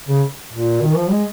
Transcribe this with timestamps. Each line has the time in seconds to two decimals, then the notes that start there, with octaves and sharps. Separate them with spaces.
0.08 C#3
0.53 A#2
0.82 D#3
0.96 F3
1.10 G#3